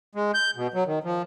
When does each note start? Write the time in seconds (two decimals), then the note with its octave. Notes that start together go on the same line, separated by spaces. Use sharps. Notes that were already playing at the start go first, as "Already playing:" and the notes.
0.15 G#3
0.34 G6
0.56 B2
0.74 F#3
0.86 D#3
1.04 F3